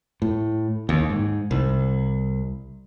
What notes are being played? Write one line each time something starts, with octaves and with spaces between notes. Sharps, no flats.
A2
D#2
G#2
C2